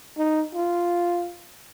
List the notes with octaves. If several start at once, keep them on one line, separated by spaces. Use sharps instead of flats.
D#4
F4